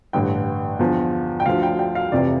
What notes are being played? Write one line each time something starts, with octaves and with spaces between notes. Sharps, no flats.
A1 G2 D3 G5
E2 D3 F3
G5
D2 D3 F3 F5
G5
G5
F5
F1 F2 C3 E3 D5